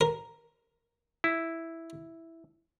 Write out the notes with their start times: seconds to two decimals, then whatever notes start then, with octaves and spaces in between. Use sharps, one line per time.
0.01 A#4
1.24 E4